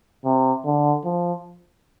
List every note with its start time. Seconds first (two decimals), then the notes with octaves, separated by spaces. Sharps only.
0.24 C3
0.65 D3
1.04 F3